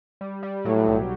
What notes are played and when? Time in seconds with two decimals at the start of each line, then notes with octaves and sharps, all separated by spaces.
0.21 G3
0.43 G3
0.65 A2 F#3
0.87 B1